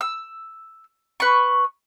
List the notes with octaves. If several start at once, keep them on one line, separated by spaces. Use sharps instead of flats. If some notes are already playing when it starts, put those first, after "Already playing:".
E6
B4 C#6